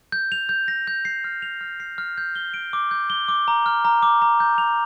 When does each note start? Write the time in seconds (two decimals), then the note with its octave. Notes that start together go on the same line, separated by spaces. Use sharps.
0.12 G6
0.32 F7
0.49 G6
0.68 A#6
0.87 G6
1.05 C7
1.24 F6
1.42 F7
1.61 F6
1.80 C7
1.98 F6
2.18 G6
2.35 G7
2.54 D7
2.73 D6
2.91 G6
3.10 G7
3.28 D6
3.48 A#5
3.66 F6
3.85 A#5
4.02 D6
4.22 A#5
4.40 G6
4.58 F7